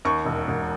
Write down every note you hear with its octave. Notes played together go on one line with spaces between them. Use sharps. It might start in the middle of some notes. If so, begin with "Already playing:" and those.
D#2 C#6
E1
E1